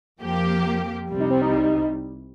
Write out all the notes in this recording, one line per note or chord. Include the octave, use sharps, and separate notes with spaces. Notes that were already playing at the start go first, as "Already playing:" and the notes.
F2 F3 A#3 G4
C2 C3 G3
D#4
C4
D#4